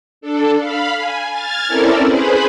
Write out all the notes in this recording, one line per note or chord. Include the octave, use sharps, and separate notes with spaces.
D4 A4
F5 B5
G#5
F6 G#6 A6
C4 C#4 E4 A4 A#4 D5
G#4 B4 C5 B5